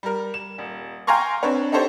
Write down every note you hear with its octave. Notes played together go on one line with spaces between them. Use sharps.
G3 A#4
E7
D#1
F5 G5 G#5 A#5 C6 C#6
C4 D4 B4 C#5
D#4 G4 A4 C5 C#5